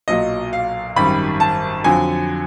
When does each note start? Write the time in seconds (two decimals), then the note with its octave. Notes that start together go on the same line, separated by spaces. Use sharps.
0.08 B1 A#2 F#3 D#5
0.53 F5
0.96 G#1 F#2 D#3 G3 B5
1.40 A5
1.84 F2 D3 F#3 G#5